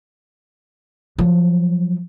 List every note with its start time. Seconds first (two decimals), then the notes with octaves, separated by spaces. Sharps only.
1.19 F3 F#3